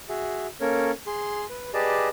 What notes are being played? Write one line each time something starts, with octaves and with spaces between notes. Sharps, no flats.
F#4 G#4 E5
A#3 C#4 A4 A#4 C#5
G#4 C6
B4
G4 G#4 B4 D5 D#5 A5